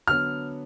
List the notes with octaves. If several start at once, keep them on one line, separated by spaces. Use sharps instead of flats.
D3 F#3 B3 F6